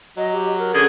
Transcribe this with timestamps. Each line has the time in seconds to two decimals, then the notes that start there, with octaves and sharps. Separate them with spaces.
0.17 F#3 D#5
0.33 G4
0.58 A#4
0.74 D3 C#4 G#4